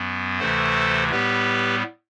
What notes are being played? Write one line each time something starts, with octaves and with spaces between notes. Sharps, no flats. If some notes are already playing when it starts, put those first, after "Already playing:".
Already playing: F#2 F#3 B3
D2 C3 E3 A3 A4 C5
A2 G3 B3 G4 B4